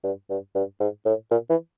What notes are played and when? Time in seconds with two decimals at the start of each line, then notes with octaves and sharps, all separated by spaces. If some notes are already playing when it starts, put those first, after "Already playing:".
0.04 G2
0.30 G2
0.55 G2
0.80 G#2
1.06 A2
1.31 A#2
1.50 E3